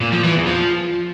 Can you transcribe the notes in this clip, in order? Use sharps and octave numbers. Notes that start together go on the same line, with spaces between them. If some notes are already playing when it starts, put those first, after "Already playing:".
A#2
F3
E3
E2
F3